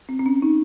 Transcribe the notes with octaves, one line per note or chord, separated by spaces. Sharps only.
C4
C4
C#4
D#4